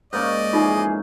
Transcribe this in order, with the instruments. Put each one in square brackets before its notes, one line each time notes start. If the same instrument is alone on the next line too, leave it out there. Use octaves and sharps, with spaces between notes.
[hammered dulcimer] G#2 A#3 C#4 [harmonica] D5 D#5
[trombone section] F2 E3 G#4 [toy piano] D#4 F4